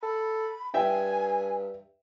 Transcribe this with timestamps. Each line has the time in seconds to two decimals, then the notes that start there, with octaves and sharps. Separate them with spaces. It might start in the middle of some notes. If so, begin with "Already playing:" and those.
0.03 A4 B5
0.74 G2 E5 G5 G#5